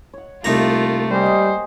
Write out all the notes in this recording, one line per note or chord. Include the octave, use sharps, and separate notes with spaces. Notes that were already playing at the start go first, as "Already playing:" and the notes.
C#5 F#5
C2 A3 A#3 D#4 F4 A#5
G3 G4 G#4 C5 D#5